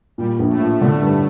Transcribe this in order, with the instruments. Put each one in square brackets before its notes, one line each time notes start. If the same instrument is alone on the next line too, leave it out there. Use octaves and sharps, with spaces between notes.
[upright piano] A#2 [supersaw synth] G3
[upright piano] A#1
[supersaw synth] A2 A3
[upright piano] F3
[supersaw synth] A2 A3 [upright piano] D3
[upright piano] G2